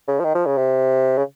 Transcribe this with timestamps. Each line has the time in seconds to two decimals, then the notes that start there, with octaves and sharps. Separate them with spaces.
0.08 C#3
0.20 F3
0.25 D#3
0.35 F3
0.46 C#3
0.58 C3
1.18 C#3